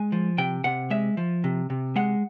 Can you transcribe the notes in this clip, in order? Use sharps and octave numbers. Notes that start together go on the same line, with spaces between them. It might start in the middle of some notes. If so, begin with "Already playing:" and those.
Already playing: G#3 G#5
F3
C3 G5
C3 F#5
G#3 E5
F3
C3
C3
G#3 F#5